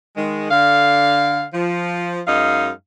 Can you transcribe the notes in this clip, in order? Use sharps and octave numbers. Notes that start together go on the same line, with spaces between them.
D#3 G#3
D3 F5
F3
F#2 G#3 D#4 F5